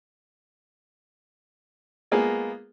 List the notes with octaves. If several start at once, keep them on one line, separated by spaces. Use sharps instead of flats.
G#3 A#3 B3 F4 G#4